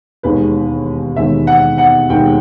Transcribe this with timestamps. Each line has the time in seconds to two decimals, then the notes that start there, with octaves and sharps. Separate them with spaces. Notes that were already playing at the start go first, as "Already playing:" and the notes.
0.23 E1 D#2 D#3 G#3 B4
1.16 E1 D#2 D#3 G#3 E5
1.47 F#5
1.78 F#5
2.09 E1 D#2 D#3 G#3 G5